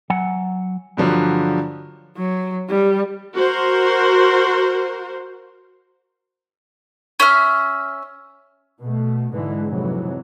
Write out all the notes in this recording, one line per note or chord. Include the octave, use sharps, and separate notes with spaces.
F#3 F#5 G#5
G2 D3 F3 F#3
F#3
G3
F#4 A#4 C5
C#4 E5 F6
B2 A3
G#2 D3 E3 G#3
F2 G#2 C3 E3 F#3